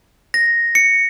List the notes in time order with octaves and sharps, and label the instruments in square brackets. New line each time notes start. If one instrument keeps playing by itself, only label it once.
[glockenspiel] A#6
C#7